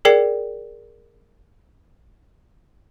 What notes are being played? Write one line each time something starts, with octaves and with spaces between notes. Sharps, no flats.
G#4 A#4 D5 G5 C7